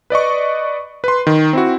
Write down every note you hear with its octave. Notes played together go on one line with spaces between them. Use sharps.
B4 D5 D#5 C#6
B4 C6
D#3
C4 E4 F#4